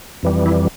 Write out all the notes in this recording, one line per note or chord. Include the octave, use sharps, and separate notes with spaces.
F2 E3 G3
E4